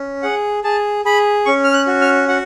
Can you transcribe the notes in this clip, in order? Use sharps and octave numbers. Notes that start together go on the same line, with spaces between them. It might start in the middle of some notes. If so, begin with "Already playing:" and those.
Already playing: C#4
G#4 F#5
G#4 A5
G#4 B5
C#4 C#6
F6
F#6
F#4
F6
F#4 F#5